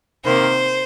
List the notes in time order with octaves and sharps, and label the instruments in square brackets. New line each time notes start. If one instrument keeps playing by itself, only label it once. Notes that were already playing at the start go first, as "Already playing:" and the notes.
[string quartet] C3 D#3 A#3 C5